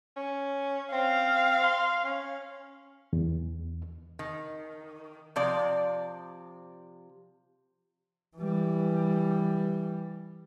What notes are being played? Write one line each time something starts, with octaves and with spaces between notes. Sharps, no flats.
C#4
C4 F5
C6
C#4
E2
D#3
C3 F3 D5
E3 G3